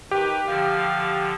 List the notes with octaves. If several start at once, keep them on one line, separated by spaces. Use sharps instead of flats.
D#3 G4 B4
D3 F3 F5